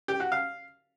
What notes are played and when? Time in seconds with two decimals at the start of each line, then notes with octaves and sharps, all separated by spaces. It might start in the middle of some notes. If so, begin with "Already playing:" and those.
0.08 G4
0.20 F#4
0.32 F5